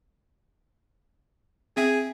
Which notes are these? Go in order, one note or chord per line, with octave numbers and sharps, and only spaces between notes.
C4 G#4 E5